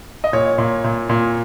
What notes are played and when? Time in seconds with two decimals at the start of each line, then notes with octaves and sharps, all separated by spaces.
0.24 D#5
0.33 A#2 C#5
0.58 A#2
0.84 A#2
1.09 A#2